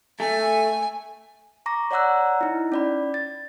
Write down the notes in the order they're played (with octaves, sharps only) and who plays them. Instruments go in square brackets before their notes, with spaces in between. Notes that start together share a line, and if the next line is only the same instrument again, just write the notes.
[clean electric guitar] A3 [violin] G#5
[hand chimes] A#5 C#6 D6 A#6
C#5 D5 F#5 A#5 E6 F#6
D#4 E4
C#4 D5 B5
A6